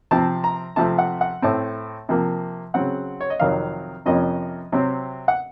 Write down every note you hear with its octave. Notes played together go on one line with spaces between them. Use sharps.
C3 F3 C4 A5
A#5
C3 F3 A3 C4 A5
F#5
F#5
A2 A3 C4 A5
C3 F3 A#3
C#3 F#3 C4 F#5
C#5
D#5
F2 C3 D#3 F#3 F5
F2 C3 F3 A#3 C#4 D#5
C3 F#3 C4
F#5